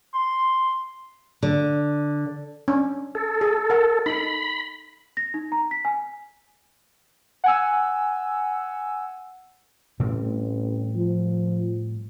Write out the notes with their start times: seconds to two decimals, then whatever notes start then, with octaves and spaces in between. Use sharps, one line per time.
0.14 C6
1.43 D3
2.68 C#4 D4
3.15 A4
3.41 G#4
3.70 A#4 F#5
4.06 D#4 A4 B5
5.17 A#6
5.34 D#4
5.52 A#5
5.71 B6
5.85 G#5
7.44 F#5 G#5 E6
10.00 A1 A2 G3 C4
10.96 F3